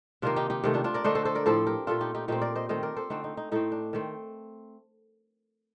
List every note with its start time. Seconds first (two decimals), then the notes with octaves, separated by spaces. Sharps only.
0.22 C3 D#3 A#3 D4 F4
0.36 D#4 G4
0.50 D#4 G4
0.64 C3 D#3 A3
0.74 D4 F4
0.84 D4 F4
0.94 A#4 D5
1.04 D3 A3 D4 C5 D#5
1.15 A4 C5
1.25 A4 C5
1.35 A#4 D5
1.46 A2 F3 C4 A4 C5
1.67 G4 A#4
1.87 A#2 A3 D4 F4 A4
2.01 D#4 G4
2.15 D#4 G4
2.28 A#2 A3 C4 D#4 G4
2.41 A#4 D5
2.56 C5 D#5
2.69 D#3 A3 C4 C5 D#5
2.83 A#4 D5
2.96 A4 C5
3.10 D3 A3 C4 D#4
3.24 D#4
3.37 D#4
3.52 A2 A3 C4 D#4
3.72 D4
3.93 D#3 A3 C4